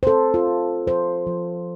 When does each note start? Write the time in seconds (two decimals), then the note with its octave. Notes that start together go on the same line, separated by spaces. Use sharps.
0.03 C5
0.07 C4 A4
0.34 F4
0.48 C4
0.87 F3 C5
1.27 F3